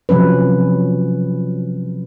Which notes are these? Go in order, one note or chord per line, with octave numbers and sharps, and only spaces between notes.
C3 F3 F#3 C#4 B4